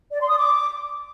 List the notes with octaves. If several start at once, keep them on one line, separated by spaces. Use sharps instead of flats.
D5
C6
D#6
D6